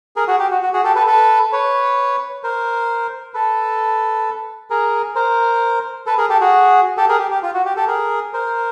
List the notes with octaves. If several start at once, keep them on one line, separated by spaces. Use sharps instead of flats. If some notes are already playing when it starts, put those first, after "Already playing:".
G#4 A#4
F#4 G#4
G4
F#4
F#4
F#4 G#4
G4 A4
A4 B4
A4 B4
B4 C#5
A#4 C5
A4 B4
G#4 A#4
A#4 C5
A4 B4
G#4 A#4
G4 A4
F#4 G#4
G4 A4
G#4 A#4
G4
G4
F4
F#4
G4
G4 A4
G#4 A#4
A#4 C5